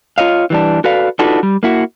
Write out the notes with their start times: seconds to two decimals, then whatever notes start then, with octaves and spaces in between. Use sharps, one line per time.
0.18 F4 C#5 D#5 F5
0.50 E3 G3 D4
0.84 F#4 A4 B4 D5 F5
1.19 D4 D#4 F4 F#4 A4 B4
1.43 G3
1.63 A#3 E4 F#4